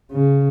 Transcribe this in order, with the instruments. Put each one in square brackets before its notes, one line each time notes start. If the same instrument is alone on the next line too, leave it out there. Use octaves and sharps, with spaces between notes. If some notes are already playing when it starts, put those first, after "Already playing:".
[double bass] C#3